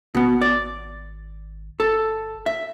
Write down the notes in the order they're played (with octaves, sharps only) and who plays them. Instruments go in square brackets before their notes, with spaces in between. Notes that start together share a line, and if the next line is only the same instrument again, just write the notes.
[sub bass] G#1 [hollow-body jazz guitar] B2 B3
[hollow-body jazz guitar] D5
[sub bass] G1 [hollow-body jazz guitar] A4
[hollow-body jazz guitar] E5